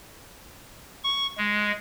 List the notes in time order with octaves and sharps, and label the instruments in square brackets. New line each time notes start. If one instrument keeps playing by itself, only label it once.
[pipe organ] C#6
G#3